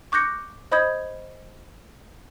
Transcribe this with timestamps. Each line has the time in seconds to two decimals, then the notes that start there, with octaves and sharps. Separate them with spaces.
0.12 C#6 D6 F#6 G6 A#6 C#7
0.72 C5 D#5 B5 D#6 G6 G#6